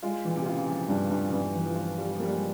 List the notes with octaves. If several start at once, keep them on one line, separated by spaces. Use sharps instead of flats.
G#3 F4
A#2 E3
C3
C#3 F4
E3
F3 F4
G2
G2
C#3
G2 E3
E3
F3
F4
G3 F4
F3
G3 A#3
G#3